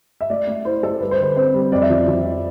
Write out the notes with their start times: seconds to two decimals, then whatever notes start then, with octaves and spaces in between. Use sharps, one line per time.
0.21 E5
0.30 A3 D5
0.47 A3
0.65 E4 C5
0.82 E4 A4
1.01 G3 B4
1.11 C5
1.18 D3 B4
1.36 C4 C5
1.54 G3
1.72 F2 D5
1.82 E5
1.90 F3 D5
2.07 F3
2.25 F2